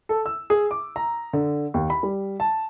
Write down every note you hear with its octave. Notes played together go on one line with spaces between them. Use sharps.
A4
E6
G#4
D6
A#5
D3
D#2
B5
G3
A5